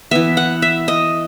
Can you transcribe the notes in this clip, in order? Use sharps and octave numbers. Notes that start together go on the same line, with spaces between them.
E3 B3 E5
F#5
E5
D#5